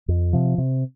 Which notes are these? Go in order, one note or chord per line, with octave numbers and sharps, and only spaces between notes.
F2
C3 F3
C3